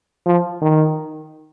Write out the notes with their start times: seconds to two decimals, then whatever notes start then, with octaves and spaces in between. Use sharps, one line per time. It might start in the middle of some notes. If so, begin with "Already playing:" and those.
0.26 F3
0.62 D#3